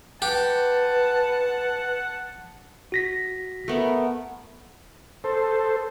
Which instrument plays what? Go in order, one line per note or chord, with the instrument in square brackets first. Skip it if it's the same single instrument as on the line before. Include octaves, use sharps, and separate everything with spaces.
[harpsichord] G4 [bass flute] B4 [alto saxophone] F#5 [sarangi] A5
[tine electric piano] F#4 A#6 B6
[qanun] A3 B3 A#4
[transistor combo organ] A4 C5